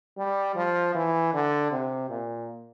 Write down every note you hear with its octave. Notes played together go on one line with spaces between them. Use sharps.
G3
F3
E3
D3
C3
A#2